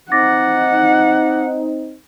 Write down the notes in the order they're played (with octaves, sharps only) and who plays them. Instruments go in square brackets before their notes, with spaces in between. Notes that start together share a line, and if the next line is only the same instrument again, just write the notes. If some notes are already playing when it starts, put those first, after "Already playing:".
[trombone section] C4 D#4 [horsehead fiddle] F#5 [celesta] D6 A6 A#6